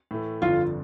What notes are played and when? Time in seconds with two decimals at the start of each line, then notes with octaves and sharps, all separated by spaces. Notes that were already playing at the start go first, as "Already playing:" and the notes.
0.11 A2 E3 A3
0.42 G1 F2 D3 F3 F4